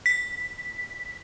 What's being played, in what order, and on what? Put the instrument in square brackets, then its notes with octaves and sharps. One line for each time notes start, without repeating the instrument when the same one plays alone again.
[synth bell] B6